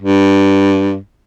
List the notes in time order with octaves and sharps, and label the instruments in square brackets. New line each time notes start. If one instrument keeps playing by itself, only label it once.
[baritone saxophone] G2